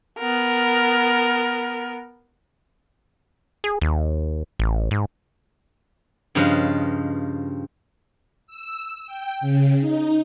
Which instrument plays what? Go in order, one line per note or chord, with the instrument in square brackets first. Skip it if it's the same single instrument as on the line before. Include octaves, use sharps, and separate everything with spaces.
[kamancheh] B3 A#4
[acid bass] G#4
D#2
A1
G#2
[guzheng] G2 C#3 F3 F4 B4 D#5
[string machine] E6
G5
C#3
D#4